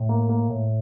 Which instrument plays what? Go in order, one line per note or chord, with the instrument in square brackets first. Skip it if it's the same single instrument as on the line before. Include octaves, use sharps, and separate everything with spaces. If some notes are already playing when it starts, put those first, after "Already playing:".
Already playing: [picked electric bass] A2
A#3
A#3
A2